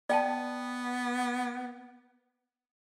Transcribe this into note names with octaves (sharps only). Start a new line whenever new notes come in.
B3 D5 G5 A5